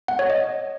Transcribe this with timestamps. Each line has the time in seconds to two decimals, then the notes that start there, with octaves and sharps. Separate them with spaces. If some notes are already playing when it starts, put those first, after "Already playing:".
0.08 F#5
0.19 C#5
0.30 D#5